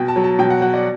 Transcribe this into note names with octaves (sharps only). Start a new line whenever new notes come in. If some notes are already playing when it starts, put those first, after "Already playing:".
Already playing: B2 G5
A5
F#3
A5
B2 G5
F#5
F#3 F#5
D5